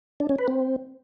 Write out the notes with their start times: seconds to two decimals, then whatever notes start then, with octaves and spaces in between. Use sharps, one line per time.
0.20 D4
0.29 C#4
0.39 B4
0.48 C4